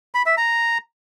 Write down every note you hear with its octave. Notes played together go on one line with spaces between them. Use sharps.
B5
E5
A#5